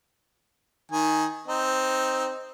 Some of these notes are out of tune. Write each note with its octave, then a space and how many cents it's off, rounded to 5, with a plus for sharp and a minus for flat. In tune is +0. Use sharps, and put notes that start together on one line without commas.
D#3 +10 G#5 +5
C4 +0 D#4 +0